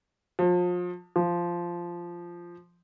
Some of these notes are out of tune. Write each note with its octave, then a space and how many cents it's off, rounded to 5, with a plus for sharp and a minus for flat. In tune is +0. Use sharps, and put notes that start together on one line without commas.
F3 +30
F3 -10